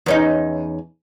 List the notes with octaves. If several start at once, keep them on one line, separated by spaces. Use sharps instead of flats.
E2 C#4 D#4